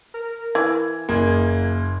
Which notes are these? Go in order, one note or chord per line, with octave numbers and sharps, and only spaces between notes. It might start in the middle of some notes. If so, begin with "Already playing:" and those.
A#4
E3 G#6
F#1 A#3 G#4 G#6